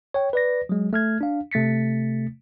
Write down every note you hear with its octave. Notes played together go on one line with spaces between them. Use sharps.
C#5 G5
B4 D5 A#6
F#3 G#3
A3 F6 G#6
D4 F5
C3 A3 A6 B6 C#7